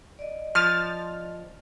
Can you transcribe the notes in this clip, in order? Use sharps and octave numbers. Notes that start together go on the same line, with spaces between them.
D5 D#5
F3 F6 A6